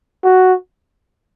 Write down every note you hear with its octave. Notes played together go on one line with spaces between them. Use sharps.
F#4